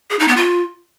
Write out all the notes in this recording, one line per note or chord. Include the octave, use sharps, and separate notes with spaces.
G#4
D#4
B3
F4